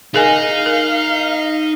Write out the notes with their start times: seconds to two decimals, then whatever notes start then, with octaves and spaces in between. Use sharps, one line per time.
0.14 D#4 G#4 A#4 F5 G#5
0.66 A#4